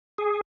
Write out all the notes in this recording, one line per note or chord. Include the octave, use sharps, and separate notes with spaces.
G#4